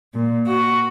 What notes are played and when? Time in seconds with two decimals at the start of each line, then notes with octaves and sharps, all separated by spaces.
0.13 A#2
0.46 F#4